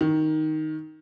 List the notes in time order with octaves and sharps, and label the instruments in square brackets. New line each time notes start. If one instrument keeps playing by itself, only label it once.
[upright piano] D#3